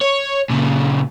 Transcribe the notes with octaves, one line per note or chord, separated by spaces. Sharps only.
C#5
A#2 C#3